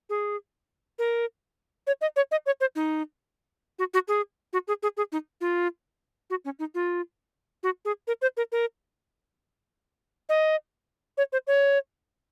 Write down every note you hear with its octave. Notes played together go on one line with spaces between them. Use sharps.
G#4
A#4
C#5
D#5
C#5
D#5
C#5
C5
D#4
F#4
F#4
G#4
F#4
G#4
G#4
G#4
D#4
F4
F#4
C#4
D#4
F4
F#4
G#4
A#4
C5
A#4
A#4
D#5
C#5
C5
C#5